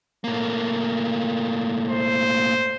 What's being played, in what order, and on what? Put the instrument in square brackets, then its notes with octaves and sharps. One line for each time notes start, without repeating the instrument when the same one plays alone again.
[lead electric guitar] A2 A#3
[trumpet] C5